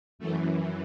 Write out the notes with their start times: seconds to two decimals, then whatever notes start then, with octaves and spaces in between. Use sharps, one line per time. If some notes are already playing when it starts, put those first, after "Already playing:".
0.19 F#2 E3 A3